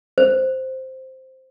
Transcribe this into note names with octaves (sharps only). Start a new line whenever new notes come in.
C5